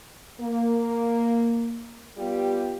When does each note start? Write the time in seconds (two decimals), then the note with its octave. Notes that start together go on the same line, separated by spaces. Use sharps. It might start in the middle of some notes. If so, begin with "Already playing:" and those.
0.41 A#3
2.17 G3 B3 F4 G4